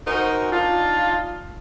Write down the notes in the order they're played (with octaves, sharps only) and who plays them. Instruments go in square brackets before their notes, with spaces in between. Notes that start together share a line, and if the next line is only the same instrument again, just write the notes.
[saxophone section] C#4 D#4 F#4 A#4 C5
D4 D#4 F4